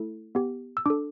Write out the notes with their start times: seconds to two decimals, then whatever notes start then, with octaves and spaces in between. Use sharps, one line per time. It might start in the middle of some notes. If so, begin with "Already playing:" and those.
Already playing: A3 E4 A4
0.35 B3 G4
0.77 E6
0.86 D4 A4 D6